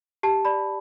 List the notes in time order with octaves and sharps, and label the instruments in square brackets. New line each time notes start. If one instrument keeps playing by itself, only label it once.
[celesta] G4 A5
D5 B5